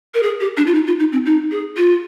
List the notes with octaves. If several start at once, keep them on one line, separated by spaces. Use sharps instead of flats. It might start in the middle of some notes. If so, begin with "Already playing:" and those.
A#4
G#4
G4
D4
F4
D#4
F4
D#4
C4
D#4
G#4
F4